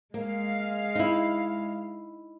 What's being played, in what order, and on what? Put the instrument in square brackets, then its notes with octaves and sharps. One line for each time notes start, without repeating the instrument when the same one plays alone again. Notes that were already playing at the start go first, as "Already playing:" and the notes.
[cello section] G#3 F5 [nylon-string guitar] A#3
[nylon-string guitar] D#4 E4